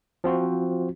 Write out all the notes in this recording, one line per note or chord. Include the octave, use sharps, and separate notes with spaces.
F3 C4 F4 F#4